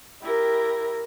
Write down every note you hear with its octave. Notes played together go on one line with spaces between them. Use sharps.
E4 G4 A#4